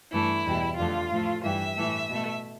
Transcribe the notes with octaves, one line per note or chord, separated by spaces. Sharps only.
G2 E3 A3 E4
E2 B2 G3
F2 D3 A3 F4
A2 F3 A3
G2 E3 G3 E5
A2 E3 A3
B2 A3